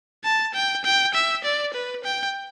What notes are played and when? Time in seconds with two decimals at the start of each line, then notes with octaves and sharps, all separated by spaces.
0.24 A5
0.54 G5
0.85 G5
1.14 E5
1.44 D5
1.74 B4
2.04 G5